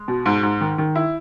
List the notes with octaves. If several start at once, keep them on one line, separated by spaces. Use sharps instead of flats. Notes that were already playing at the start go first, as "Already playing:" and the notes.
Already playing: G#3
B2
G#2
G#2
D#3
D#3
E4